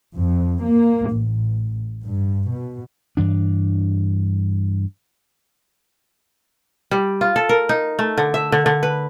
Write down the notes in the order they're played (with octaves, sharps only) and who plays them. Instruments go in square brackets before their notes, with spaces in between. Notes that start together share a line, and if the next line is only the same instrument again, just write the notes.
[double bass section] F2
A#3
A1
G2
B2
[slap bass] G2 E3 D4
[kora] G3
F4
A4
A#4
D#4
A3
D3
E5
D3
D3
B4